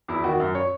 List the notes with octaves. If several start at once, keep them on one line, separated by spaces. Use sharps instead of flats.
E2 E4
D#3 F#4
F#2
C#5